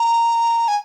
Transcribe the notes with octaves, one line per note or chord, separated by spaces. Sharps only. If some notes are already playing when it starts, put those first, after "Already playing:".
Already playing: A#5
G#5